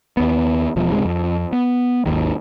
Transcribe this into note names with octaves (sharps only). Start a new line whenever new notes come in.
D#2 B3
E1 B2 F3
C#2 G#2 C3 G#3
F2
B3
G#1 D#2 D#3